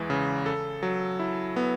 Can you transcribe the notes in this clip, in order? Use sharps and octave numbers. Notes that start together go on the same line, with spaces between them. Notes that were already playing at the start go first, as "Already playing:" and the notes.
Already playing: E2 E3 G#3
C#3
A4
F#3
E4
B3